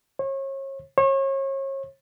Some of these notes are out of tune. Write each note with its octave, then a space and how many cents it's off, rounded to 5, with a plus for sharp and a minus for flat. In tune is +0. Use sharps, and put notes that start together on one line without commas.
C#5 -35
C#5 -35